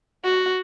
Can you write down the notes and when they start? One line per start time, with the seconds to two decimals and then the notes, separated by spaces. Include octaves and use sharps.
0.24 F#4